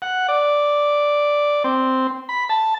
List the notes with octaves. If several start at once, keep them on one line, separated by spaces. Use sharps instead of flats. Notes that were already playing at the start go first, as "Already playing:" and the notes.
F#5
D5
C4
B5
A5